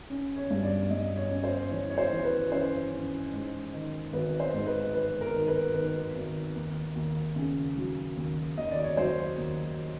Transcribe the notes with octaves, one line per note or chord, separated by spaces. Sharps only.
C#4
C#5
G2
D5
G2 D#5
C#5
C#4
C5
E3 C#5
C#5
C5
E3
B4
C#4 C5
C#4
G#2
D#3
G#1 B4
C5
G#2
B4
G#2 B4
A#4
D#3
B4
D#3 B4
G#1
D#2
D#2
C#3
F#3
D#2
D#2 D#5
D5
C#5
F#3 C5
D#2